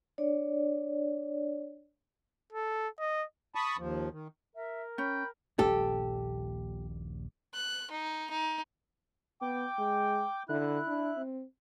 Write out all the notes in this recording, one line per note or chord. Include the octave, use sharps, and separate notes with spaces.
D4 C#5 D5
A4
D#5
A5 B5 C#6 D#6
D#2 F3
D#3
A#4 E5
C#4 G5 B5
D#1 A#1 G3 G4 A4
F#6
D#4
D#4
B3 G5 D6
G#3
D3 E4 F#6
D4
C4